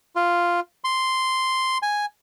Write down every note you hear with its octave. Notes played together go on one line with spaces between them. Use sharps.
F4
C6
G#5